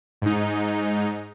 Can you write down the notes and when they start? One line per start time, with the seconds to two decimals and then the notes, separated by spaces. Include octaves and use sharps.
0.22 G#2 D#4